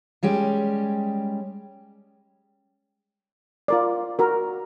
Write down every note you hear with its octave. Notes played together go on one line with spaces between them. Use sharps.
G3 G#3 C#4 G4
F4 A#4 D5
F#4 A#4